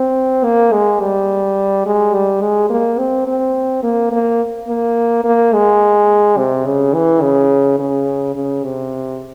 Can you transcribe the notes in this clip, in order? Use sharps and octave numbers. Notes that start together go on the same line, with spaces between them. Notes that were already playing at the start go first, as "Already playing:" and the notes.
Already playing: C4
A#3
G#3
G3
G#3
G3
G#3
A#3
C4
C4
A#3
A#3
A#3
A#3
G#3
C3
C#3
E3
C#3
C#3
C#3
C3